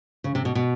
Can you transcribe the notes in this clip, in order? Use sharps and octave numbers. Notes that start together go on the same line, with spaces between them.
C#3
C3
B2
B2